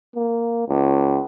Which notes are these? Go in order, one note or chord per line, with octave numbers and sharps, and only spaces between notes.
A#3
C#2